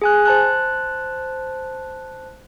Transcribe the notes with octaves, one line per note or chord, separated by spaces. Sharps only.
G#4 G#5 F#6
C5 A5 F#6